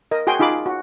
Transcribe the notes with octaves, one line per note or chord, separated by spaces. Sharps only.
A#4 D#5
F#4 G#4 G5 G#5 C6
D#4 F4 G#4 B5 D6
F#4